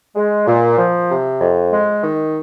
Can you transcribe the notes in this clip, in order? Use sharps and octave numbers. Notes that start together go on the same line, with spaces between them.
G#3
A#2
F3
C3
F2
G#3
D#3